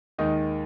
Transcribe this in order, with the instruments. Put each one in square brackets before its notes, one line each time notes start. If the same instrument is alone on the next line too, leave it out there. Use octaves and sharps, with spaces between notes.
[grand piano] D#2 D#3 G#3 D#4